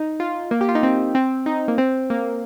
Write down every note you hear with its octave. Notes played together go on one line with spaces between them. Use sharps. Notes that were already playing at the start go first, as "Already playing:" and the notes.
Already playing: D#4
F4
A#3
G4
F4
D#4
C4
C4
D#4
A#3
C4
A#3